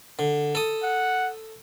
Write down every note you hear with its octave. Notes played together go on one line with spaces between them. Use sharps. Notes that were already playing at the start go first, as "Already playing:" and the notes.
D3
A4 D#6
F#5